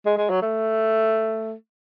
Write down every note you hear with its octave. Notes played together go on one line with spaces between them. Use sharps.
G#3
G#3
F#3
A3